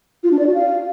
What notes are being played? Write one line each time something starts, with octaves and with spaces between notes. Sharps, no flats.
F4
D4
D5
F#4
F5